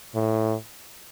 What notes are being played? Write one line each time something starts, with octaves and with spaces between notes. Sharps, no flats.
A2